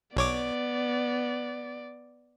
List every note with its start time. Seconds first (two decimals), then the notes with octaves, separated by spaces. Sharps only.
0.17 B1 B3 C#5 D5 D6